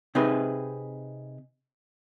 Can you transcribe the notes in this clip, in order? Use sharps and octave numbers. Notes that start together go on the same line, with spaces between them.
C3 C4 D#4 G#4 B4